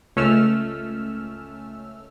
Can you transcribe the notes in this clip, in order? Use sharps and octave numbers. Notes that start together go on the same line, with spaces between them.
C#2 A3 C#4 E6 F6